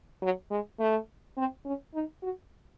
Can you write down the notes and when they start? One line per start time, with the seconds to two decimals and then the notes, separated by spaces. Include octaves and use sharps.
0.22 F#3
0.51 G#3
0.79 A3
1.37 C4
1.65 C#4
1.94 D#4
2.23 F#4